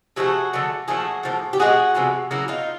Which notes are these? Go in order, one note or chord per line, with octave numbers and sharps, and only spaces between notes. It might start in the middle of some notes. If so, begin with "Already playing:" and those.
C3 F3 A3 F#4 G#4
D3 F#3 A3
A#2 F3 A3 F#4 G#4
A2 F3 A#3
G4
B2 G#3 B3 F#4 G#4
C3 F3 G#3 B3
C#3 F#3 A#3 E4 F#4
D#4 F4